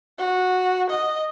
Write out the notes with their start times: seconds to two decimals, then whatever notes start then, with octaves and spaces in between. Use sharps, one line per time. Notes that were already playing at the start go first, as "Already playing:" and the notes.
0.18 F#4
0.89 D#5